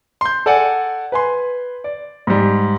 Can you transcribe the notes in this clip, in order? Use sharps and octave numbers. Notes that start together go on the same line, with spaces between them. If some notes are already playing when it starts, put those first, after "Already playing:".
C6 G6
A4 D5 F#5 G#5
B4 G#5 C6
D5
G#2 G3